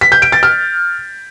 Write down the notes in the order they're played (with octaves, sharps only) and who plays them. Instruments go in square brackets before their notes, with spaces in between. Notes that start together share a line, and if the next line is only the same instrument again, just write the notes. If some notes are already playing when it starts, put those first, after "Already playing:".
[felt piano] B6
G6
D7
A6
F6